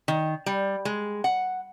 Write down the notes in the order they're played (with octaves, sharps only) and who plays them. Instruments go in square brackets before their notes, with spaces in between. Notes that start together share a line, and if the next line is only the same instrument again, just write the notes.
[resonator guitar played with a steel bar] D#3
G3
G#3
F#5